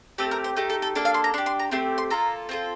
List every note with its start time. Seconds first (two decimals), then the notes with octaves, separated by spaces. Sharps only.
0.18 A3 C4 G4 A4
0.31 A#4
0.44 C5
0.57 A3 D#4 G4
0.70 A4
0.82 A4
0.95 A#3 D4 A4
1.05 F5
1.14 C6
1.24 A#5
1.34 D4 C6
1.38 G4
1.46 C6
1.59 A#5
1.71 A3 C4 G4 C6
1.98 C6
2.10 A#3 F4 A4 A#5
2.49 C4 F4 A4